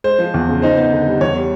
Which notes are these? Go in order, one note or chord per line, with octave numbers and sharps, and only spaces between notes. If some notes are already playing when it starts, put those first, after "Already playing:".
G#3 C5
F3
E2
C#3
D#4 C5
B3
D3
G3
E2 C#5
G3